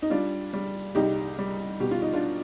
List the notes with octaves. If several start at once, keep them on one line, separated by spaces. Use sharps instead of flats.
D#4
G3 D4 F4
G3
C2 D#4 G4
G3
B2 G4
F4
D#4
D4 F4